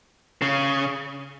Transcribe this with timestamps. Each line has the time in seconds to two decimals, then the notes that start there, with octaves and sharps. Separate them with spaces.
0.42 C#3